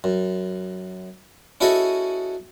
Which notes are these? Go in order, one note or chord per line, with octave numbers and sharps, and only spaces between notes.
F#2
C#4 E4 F#4 G#4 A4 D#5